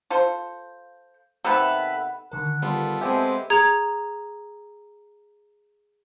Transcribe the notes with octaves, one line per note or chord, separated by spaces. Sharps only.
F4 A4 C5
C3 D#3 B3 A4 B4 E5
D3 D#3 A#4 F#5
G3 B3 F4 A4
G#3 B3 C4 G4 A4 E5 G#5
G#4 A#5 G#6